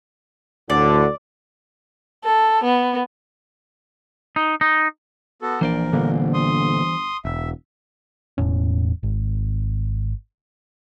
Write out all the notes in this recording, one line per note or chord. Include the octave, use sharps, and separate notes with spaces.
D2 A2 D3 D5
A4
B3
D#4
D#4
B3 F#4 A4
A#1 E3 A#4 C5 D5
G1 A#2 D3 A#3
C6 D#6
E1 E5
E1 E2 A2 C#4
G#1